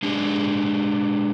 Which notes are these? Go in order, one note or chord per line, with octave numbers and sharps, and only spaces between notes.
G#3 D4 G4 G#4